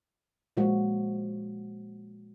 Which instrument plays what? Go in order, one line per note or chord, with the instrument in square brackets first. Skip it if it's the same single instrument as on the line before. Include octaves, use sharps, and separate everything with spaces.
[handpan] A#2 F3 G#3 F#4